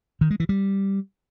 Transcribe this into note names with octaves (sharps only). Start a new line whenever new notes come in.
D#3
G#3
E3
G3